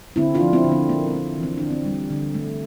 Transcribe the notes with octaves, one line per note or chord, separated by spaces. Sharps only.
D3 C4 E4
D4 F4
F3
C4 E4
D3
C4
A#3
C4
A#3
E3
C4
D3 D4
C4
G3
D3
A3